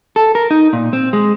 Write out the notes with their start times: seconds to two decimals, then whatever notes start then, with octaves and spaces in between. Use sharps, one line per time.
0.16 A4
0.35 A#4
0.51 D#4
0.73 A#2
0.93 C4
1.13 G#3